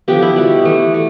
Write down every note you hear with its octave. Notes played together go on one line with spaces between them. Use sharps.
D3 F3 B3 G4
E4
B2 G3 B3
E3 A3
A3